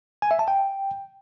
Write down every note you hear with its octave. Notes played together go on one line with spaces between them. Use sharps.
G#5
E5
A5
G5